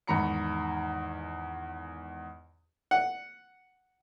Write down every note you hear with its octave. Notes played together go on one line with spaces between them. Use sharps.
E2 G#2 D#3 A#5 B5 C#7
F#5